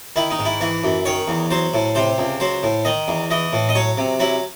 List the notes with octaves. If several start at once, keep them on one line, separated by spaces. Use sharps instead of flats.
D#3 E4
D#4
G#2
E4
E3 E4
F#2
D#3 C#5
E2
F#3 C5
A2
C3 C5
C#2
F#3 C5
A2
D#3 D#5
E2
E3 D#5
A2
D#5
F#3 C#5
C3
F#3 E4